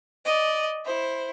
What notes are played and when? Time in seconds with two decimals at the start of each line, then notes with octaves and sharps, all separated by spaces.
0.25 D5 D#5
0.85 E4 C5